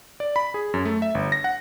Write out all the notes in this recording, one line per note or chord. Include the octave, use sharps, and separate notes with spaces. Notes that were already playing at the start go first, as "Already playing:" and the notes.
D5
B5
G#4
F#2
A3
E5
G1
A#6
F#5